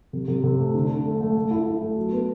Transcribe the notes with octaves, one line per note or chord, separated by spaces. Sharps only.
C3
C3
C3
A3
D3
D3
A3
A3
A3
E4
E4
A3
F#3
B3